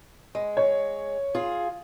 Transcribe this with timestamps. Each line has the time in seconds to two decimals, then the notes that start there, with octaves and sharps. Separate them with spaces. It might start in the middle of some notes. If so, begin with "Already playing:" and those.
0.35 G#3
0.57 C#5
1.35 F4 G#4